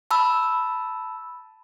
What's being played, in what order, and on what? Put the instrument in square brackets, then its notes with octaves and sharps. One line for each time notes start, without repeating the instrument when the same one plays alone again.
[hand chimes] A5 B5 E6